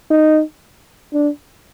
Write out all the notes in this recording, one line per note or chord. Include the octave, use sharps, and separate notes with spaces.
D#4
D4